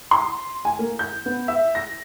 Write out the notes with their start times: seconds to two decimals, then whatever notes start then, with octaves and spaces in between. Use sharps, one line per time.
0.11 C6
0.65 G#5
0.79 A#3
0.99 G6
1.26 B3
1.48 E5
1.75 A#6